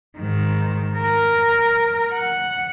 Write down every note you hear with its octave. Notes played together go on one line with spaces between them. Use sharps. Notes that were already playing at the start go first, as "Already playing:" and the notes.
G#2 D#3
A#4
F#5